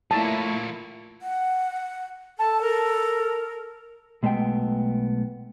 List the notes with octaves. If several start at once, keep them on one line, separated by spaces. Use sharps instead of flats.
F3 A3 A#3 E4 C#5 A5
F#5
A4 A5
A#4
B1 G#3 A3 B3 G5